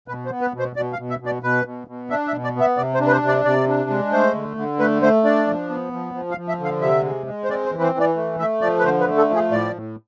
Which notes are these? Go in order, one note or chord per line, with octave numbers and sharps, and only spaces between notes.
B2 B4
C5
B3
B4
B2
C5
B2 D5
F5
B2
E5
B2
D5
B2 B4
B2
B2
D4 E5
E5
B2
D5
B3 E5
C3 D5
C5
D4
B4
C5
C3
D5
C3 D5
D4
G#3
A3 C5
D3
D3
A3 B4
A3 C5
D4 D5
F3
B3
F3
F3
F5
F3
E5
D3
F5
C3 E5
G#3
G#3
C5
C4 D5
C5
E3
B4
C5
E3
D5
A3
A3 E5
F3 D5
B4
D3 C5
B4
A3
A4
F3
G#4
A2 D5
A2